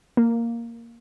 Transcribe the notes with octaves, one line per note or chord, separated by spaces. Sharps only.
A#3